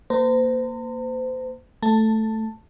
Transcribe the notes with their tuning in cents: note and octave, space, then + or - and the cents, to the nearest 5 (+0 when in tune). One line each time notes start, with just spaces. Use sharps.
A#3 +0 C5 -35 A#5 -45
A3 +0 A5 +15